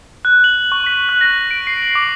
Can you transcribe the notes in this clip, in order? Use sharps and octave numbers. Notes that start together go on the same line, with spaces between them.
F#6
F#7
C#6
B6
F#6
A#6
D7
C7
F#7
D6